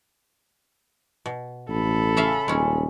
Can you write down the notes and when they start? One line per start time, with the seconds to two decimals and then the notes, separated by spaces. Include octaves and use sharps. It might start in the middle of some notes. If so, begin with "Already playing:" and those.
1.26 B2
1.69 A1 A4 B5
2.17 C#3 E5 F5
2.48 D#1 G#3 C#4